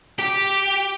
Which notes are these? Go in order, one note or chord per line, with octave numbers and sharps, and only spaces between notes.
G4